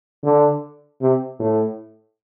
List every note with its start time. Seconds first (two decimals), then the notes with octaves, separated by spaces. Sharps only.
0.24 D3
1.01 C3
1.40 A2